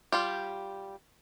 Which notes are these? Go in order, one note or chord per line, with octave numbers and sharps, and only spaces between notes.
G3 F4 G4